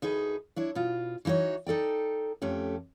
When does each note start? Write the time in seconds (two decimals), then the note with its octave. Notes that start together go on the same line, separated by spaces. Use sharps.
0.02 D2 D#4 G#4 B4
0.56 D4 E4 C#5
0.75 B2 F4
1.25 E3 D#4 E4 F#4 C#5
1.67 D#4 A4 D5 G5
2.42 F2 A3 C#4 G4